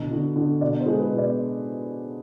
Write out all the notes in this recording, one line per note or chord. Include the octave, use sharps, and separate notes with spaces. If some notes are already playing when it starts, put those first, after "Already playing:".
Already playing: B2 D3
D3
D3
B2 D5
C5
G#3
B4
B2
D5